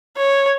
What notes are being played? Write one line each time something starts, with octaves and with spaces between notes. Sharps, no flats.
C#5